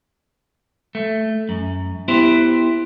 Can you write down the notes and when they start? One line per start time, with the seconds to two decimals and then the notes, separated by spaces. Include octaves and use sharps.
0.95 A3
1.49 F#2
2.08 B3 E4 G4 C5